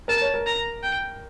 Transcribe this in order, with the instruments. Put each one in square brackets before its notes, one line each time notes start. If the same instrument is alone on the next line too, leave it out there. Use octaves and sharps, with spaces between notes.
[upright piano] A#4 [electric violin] A5
[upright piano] C#5
A#4
[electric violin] A#5
G5